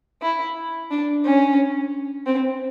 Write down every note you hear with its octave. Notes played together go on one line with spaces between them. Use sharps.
E4
D4
C#4
C4